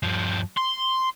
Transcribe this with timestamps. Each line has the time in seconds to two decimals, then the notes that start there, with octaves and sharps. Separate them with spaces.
0.03 G2 F3
0.57 C6